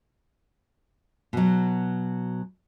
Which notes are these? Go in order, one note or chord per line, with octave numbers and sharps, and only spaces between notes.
B2 F#3